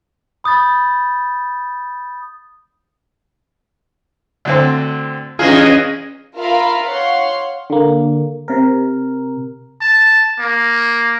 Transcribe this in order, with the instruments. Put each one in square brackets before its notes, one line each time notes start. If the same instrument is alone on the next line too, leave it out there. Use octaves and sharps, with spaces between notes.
[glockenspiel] B5 D#6 G6 A6
[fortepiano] D2 D3 C4
[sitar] G2 E3 G#3 [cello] C#4 D#5 [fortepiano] F4 G#4 F5
[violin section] F4 A#4 E5 F5 B5
C#5 F5 F#5 C6
[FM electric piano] D3 A#3
C3 A#4
[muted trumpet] A5
A#3